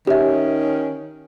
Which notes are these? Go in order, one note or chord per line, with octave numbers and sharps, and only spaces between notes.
D#3 C#4 G4 E5